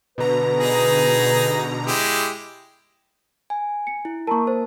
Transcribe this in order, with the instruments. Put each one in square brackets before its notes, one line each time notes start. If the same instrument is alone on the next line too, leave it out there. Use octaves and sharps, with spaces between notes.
[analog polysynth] B2 D3 A#5 [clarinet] B4
[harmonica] D#4 G#4
G#3 E4 G4
[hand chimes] G#5
[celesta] C#7
[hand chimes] E4
[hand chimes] A#3 A#4 [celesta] A5 A#5 C#6
[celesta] C5 [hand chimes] A5